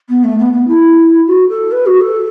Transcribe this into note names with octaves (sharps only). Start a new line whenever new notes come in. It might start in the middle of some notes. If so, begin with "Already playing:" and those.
B3
A3
B3
B3
E4
F#4
A4
B4
F#4
A4